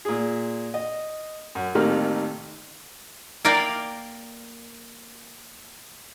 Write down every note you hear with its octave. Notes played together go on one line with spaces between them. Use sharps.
A#2 G#4
D#5
F#2
A1 C3 D#3 A#3 F6
A#3 A#4 D5 F5 G5